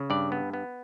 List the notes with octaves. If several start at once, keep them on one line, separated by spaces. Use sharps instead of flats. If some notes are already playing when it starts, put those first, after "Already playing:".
Already playing: C#3
G2 D5
B3
B3